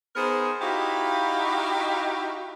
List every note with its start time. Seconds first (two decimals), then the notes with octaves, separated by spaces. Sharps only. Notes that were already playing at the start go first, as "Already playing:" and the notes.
0.16 B3 D#4 G#4 A#4 C5
0.61 D#4 E4 F#4 G4 D#5 F5